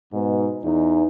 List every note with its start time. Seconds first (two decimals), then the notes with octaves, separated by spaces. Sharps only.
0.13 G#2 B2
0.64 E2 D#4